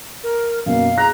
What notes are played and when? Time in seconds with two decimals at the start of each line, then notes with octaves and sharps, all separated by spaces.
0.24 A#4
0.66 F#2 B2 A#3 F5
0.98 G#4 A#5 F#6 A#6